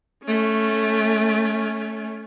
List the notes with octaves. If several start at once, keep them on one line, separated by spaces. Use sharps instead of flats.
A3 C#4